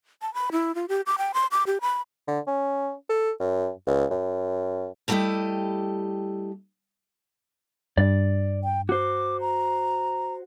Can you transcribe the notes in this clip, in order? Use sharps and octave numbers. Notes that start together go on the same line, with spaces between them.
A5
B5
E4
F4
G4
D6
G5
C6
D6
G4
B5
D3
C#4
A4
F#2
C#2
F#2
G3 A3 E4 G4 A4 D#5
G2 D5
G5
F#4 C5 D6
A#5